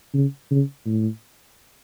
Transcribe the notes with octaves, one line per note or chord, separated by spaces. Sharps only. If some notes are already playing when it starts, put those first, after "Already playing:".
C#3
C#3
A2